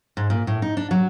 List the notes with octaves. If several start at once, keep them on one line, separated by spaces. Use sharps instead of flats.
G#2
A#2
A2
D#4
D4
F#3